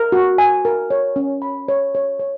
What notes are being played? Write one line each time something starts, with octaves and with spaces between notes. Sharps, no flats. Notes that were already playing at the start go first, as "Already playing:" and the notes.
Already playing: A#4
F#4
G#5
A#4
C#5
C#4
B5
C#5
C#5
C#5